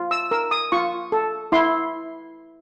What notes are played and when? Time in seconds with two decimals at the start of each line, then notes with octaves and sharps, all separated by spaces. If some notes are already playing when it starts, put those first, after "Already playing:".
Already playing: F4
0.11 E6
0.31 A#4 E6
0.51 D#6
0.72 F4 C#6
1.12 A4
1.52 E4 C6